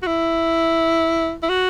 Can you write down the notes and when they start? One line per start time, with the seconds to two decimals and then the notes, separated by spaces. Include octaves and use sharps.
0.02 F#4
0.07 E4
1.43 E4
1.49 F#4